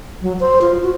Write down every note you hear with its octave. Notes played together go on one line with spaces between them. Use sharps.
F#3
C5
F4
F#4